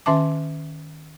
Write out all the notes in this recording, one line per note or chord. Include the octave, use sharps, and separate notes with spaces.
D#3 C#4 E5 A5 D6